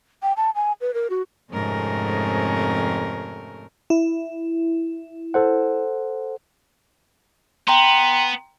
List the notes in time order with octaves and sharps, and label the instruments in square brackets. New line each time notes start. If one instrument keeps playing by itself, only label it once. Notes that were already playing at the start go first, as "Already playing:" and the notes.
[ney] G5
A5
G#5
B4
A#4
F#4
[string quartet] F2 G#2 C3 A3 C#4 A#4
[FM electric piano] E4
[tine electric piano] A4 C5 F#5
[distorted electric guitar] B3 [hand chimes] G5 A#5 C6